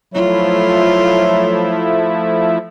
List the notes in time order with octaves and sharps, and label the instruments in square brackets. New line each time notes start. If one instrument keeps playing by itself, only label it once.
[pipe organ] F3 A3 E4 [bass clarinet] F#3 [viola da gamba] F4